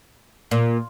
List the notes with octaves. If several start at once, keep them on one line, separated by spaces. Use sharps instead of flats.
A#2